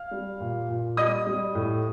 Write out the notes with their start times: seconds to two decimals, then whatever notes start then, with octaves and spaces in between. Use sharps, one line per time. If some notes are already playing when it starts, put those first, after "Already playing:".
Already playing: F5 F6
0.11 G3
0.40 A#2
0.69 A#2
0.97 G3 D#5 D#6
1.27 G3
1.55 A2